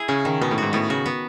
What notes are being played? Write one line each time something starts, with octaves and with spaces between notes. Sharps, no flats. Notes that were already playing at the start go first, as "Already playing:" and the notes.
Already playing: E4 G#4
C#3 C#4
D#3
B2 B3
A2
G#2 F#4
A2 B3
C#3 F#4
B3